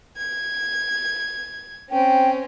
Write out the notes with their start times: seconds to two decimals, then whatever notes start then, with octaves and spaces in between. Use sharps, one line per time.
0.17 G#6
1.91 C4 C#4 G5